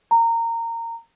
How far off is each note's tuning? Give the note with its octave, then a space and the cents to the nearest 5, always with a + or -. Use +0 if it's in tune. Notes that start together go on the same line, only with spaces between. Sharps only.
A#5 -20